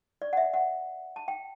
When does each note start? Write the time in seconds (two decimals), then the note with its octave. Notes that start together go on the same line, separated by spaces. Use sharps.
0.22 D5
0.33 F#5
0.37 E5
0.54 F#5
1.16 A5
1.28 G5